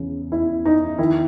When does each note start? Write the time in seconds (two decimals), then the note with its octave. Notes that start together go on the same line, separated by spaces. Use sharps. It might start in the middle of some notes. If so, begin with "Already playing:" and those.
Already playing: E2 C#3 E3
0.32 E4
0.65 D#4
0.98 D#3 E4